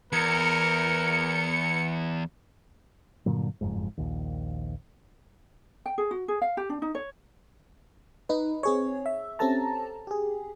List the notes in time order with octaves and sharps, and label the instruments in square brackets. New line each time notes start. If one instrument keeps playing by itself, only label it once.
[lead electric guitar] E2 [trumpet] A#4 [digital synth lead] C#7
[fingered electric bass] G2 A#2 D3 F#3
F#1 F2 G#2
A#1 D#2
[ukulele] G5
G#4
F#4
G#4
F5
G4
D4
D#4
C#5
[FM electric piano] D#4 B4
C4 G#4 C#5
E5
C4 C#4 G4 A4 A5 A#5
G4 G#4